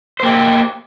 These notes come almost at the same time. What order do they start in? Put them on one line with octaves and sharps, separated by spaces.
C5 A#3 G4